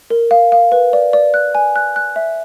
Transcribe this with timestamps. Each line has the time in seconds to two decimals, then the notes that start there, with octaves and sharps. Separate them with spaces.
0.10 A#4
0.31 F5
0.52 F5
0.72 B4
0.93 D5
1.13 D5
1.34 F#6
1.55 G#5
1.76 F#6
1.96 F#6
2.16 E5